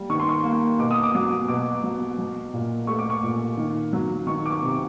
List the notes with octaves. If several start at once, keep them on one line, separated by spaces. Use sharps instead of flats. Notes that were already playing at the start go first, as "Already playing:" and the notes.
Already playing: G3 A#3
D#3 C#6
C6
C#6
A#3
B2 D6
D#6
D6
F#3
B2 D6
F#3
F#3
A#2
A3 C#6
D6
C#6
A#2
D#3
F#3
D#3 C#6
D6
C#6
C3